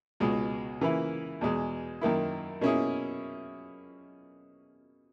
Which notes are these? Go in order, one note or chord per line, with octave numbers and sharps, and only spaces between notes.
C#2 B2 G#3
C#3 E3 A#3 E4
E2 B2 G#3
F#2 D#3 A#3 E4
B2 A#3 C#4 E4 G#4